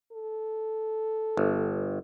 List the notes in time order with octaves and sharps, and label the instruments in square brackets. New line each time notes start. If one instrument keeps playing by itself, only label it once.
[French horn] A4
[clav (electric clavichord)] G1